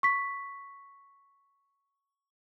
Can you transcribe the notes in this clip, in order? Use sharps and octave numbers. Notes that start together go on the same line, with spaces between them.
C#6 B6